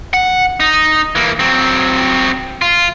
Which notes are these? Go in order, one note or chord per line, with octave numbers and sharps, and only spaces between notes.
F#5
D#4
E3 A#3
F#3 C4
F4